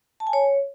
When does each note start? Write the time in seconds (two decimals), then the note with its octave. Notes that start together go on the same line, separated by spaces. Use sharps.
0.20 A5
0.27 G#5
0.33 C#5